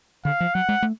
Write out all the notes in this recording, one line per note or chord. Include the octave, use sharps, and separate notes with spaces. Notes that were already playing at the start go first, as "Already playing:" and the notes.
D3 F5
F3
F#3 F#5
G#3
A3